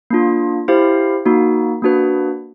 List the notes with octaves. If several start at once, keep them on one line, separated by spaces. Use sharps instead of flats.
A#3 D4 F4
E4 G4 C5 F5
A#3 D#4 F#4
A#3 D4 F#4 B4